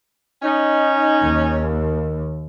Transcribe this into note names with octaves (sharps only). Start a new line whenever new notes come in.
C#4 D#4
D#2